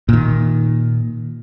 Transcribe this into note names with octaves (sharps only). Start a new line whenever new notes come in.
A#2 D#3